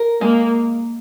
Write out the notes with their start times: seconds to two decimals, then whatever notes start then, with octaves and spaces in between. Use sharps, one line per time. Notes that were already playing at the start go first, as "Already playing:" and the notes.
Already playing: A#4
0.21 G#3 A#3